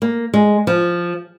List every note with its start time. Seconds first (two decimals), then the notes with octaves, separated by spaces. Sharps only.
0.02 A#3
0.34 G#3
0.67 F3